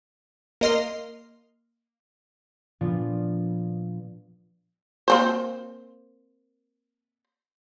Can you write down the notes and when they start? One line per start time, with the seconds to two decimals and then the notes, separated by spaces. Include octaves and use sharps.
0.61 A#3 A#4 D#5 C6 F6 C7
2.81 A#2 F3 B3 D4 F4
5.08 A#3 C4 C5